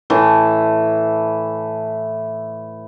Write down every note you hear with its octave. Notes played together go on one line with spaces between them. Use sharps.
A2 E3 A5